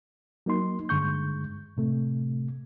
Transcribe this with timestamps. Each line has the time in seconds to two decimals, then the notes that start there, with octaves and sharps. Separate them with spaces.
0.46 F#3 A#3 D#4 C6
0.89 G2 D3 G#3 C#6 G6
1.77 A2 C3 A3